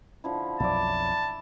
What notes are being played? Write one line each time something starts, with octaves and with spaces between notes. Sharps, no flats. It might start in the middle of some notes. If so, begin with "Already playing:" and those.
D3 F3 E4
B1 F2 F#3 E4 D5 A5